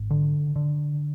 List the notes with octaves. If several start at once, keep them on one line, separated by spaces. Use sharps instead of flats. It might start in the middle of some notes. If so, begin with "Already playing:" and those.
Already playing: G#1
D3
D3